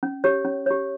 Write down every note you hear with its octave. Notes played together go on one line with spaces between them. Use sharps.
C#4
G4 C#5
C#4
G4 C#5